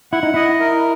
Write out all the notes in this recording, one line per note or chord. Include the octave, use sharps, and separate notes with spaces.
E4 F#5
D#4
E4 D#5
A#4